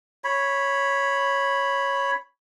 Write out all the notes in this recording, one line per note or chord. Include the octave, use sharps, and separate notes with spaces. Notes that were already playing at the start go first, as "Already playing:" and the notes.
C#5 B5